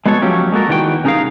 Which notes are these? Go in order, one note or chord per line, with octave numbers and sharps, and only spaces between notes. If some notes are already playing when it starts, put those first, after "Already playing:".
G#3 B3 F#4 A4 C#5
F3 F#3 A3 C#4 G4
G#3 A#3 F#4 A4 A#4
E2 D#3 E3 C4 F#4 G5
C2 C#4 D#4 G#4 A#4 F5